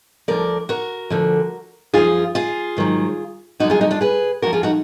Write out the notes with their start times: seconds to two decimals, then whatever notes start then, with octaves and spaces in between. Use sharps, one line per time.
0.28 D2 D3 F3 A#4 D5
0.69 F#4 A#4
1.10 D2 D3 F3
1.94 F#2 F3 F4 G#4
2.35 F4 G#4
2.77 G#2 D#3 F#3
3.60 F#2 D3 F#3 D#4 F#4
3.70 F4 G#4
3.81 D#4 F#4
3.91 D4 F4
4.01 G#4 B4
4.42 D2 D3 F3 F#4 A#4
4.53 F4 G#4
4.63 D#4 F#4